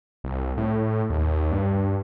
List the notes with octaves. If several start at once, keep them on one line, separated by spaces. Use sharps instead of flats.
C2
A2
D#2
G2